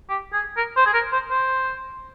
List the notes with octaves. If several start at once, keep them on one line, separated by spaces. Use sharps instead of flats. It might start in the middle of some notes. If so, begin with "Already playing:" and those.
G4
G#4
A#4
C5
G#4
A#4
C5
C5